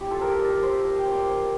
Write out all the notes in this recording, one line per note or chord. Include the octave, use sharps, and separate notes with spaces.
E4 G4
F4 A4
F3 G4 A#4
G4 A#4
C4 A#4 D5
C4 C5 E5
F3 F5
G5
C4
D5 F5
F3